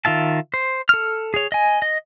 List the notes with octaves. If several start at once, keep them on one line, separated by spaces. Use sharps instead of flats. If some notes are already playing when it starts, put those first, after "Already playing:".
D#3 F4 E5 A5
C5
A4 F6
G#4 C#5
D#5 G#5
D#5